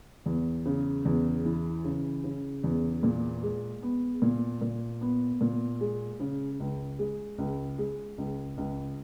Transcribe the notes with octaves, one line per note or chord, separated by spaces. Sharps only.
E2
C#3
E2
E3
C#3
C#3
E2
A#2
G#3
B3
A#2
A#2
B3
A#2
G#3
C#3
C#2
G#3
C#2
G#3
C#2
C#2